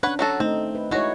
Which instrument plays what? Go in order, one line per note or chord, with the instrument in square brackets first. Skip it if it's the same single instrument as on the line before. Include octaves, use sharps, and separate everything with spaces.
[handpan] C#4 D4 [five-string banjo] B4 C#5 F#5
[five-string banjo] F#3 F#4 A4
[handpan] A3 D#4 [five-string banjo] C4
[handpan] B4
[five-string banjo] G#3 F#4 [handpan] D#4 E4 C#5